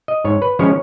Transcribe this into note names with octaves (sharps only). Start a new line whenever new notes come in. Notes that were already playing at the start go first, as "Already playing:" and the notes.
D#5
G#2 C#5
B4
F3 G#3 C#4 C#5